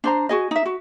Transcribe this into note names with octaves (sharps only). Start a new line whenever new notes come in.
D4 C5 A#5
F#4 G#4 D#5
D#4 E5
F#4